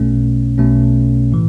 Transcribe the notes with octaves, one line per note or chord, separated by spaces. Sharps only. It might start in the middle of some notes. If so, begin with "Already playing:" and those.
Already playing: B1 B2 A3 C#4
B1 B2 A3 C#4
A2 E3